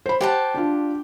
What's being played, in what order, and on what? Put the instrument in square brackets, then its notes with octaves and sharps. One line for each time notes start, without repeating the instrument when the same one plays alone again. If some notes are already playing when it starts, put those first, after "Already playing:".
[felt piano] C5 B5
[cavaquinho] G4 F#5 A5 [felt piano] C5 G5
[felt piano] D4 F4